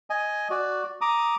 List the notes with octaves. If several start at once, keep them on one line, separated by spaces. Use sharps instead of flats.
D#5 G#5
F#4 D5
A#5 D6 D#6